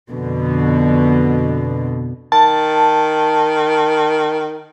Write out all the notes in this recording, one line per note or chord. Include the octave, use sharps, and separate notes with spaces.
F2 B2 D3
D#3 A5